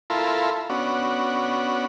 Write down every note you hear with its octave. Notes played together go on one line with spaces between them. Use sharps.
E4 F4 A4 A#4 B5 C6
B3 C#4 D4 F#4